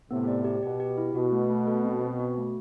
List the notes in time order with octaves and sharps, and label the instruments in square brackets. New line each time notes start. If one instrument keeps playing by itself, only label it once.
[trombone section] A2 C3 [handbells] B3
[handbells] D5
G4
[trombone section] B2 [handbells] G4
[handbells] G4
E4
[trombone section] B2 [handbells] F#4
[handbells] A3
A3
A4
C4
C4
F#4
A3